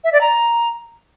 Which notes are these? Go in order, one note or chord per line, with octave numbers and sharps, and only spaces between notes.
E5
D5
A#5